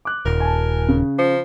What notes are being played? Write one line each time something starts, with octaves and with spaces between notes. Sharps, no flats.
D6 F#6
D#1 A#4
G#5 A5
C#3
F3